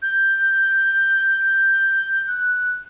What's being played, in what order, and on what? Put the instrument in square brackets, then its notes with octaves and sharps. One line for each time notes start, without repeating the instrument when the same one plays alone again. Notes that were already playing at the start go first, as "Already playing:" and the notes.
[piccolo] G6
F#6